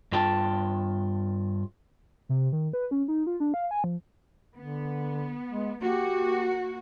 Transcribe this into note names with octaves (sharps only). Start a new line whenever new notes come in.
G2 F4 G5 A5
C3
D#3
B4
C#4
D#4
F4
D4
F5
G#5
F3
D3 B3
G#3
A#3 F#4 G4